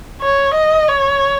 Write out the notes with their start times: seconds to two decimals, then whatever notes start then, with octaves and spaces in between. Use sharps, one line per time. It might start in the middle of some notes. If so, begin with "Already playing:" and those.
0.22 C#5
0.54 D#5
0.88 C#5